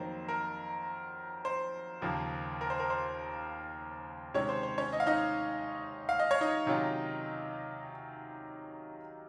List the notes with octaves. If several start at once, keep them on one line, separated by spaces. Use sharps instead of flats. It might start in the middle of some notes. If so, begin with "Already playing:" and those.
Already playing: F2 D#3 F#3 A#3 C5
A#4
C5
D#2 C#3 F3 A#3
A#4
C5
A#4
C5
C3 D#3 G#3 C#4 C#5
C5
C5
C#4 C#5
D#5
F5
D#4 D#5
F5
D#5
C#5
D#4 D#5
C3 D#3 F#3 C#4 F4